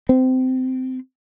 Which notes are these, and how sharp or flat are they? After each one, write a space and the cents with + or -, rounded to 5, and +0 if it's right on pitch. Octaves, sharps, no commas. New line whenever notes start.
C4 -20